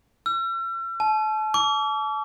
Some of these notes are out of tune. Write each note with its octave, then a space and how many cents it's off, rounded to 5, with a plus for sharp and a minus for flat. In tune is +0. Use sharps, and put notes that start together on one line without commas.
E6 +45
A5 -35
D6 -40